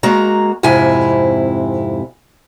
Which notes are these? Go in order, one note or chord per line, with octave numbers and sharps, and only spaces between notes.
G#3 A#3 F#4 A#5
F2 G#2 C3 E4 G#5